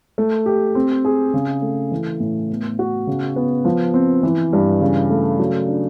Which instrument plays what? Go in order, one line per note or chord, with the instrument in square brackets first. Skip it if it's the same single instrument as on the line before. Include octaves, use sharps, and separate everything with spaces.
[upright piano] A3
G4
C4
G#4
C#3
A3
E3
A2
B3
F#4
C#3
B3
F3
C4
E3
G2
C#3
A3
F#3
D4